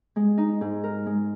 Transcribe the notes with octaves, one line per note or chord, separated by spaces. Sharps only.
G#3
D#4
G#2
A#4
G#3